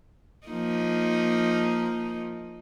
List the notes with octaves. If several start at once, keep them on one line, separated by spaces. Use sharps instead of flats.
F3 A#3 D#4